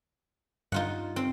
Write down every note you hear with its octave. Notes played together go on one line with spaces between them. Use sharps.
G2 D#4 F4 F#5
C4